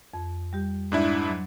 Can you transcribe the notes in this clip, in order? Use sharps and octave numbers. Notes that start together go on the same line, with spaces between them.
F2
G3 G4
G#2 D4 E4
F#3